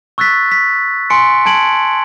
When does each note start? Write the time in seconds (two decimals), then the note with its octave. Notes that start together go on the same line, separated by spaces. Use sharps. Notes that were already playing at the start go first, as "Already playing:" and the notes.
0.18 C#6 E6 F#6 A6 B6
0.52 B6
1.10 G#5 C6 C#7 D7
1.46 A5 G#6 D7 F#7